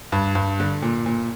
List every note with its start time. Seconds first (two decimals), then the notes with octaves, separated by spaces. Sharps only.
0.12 G2
0.35 G2
0.60 D3
0.82 A#2
1.06 A#2